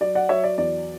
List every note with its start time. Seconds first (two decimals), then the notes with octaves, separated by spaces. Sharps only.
0.01 F#3 D5
0.15 D5 F#5
0.29 F#3 C#5 E5
0.44 D5
0.58 E2 D5